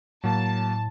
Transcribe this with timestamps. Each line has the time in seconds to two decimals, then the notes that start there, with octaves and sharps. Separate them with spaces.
0.24 A2 F#3 A#3 A5